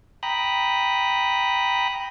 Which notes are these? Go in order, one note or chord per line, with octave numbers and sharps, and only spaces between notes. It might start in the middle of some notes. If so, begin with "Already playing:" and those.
G5 A#5 B5 D#6 F#6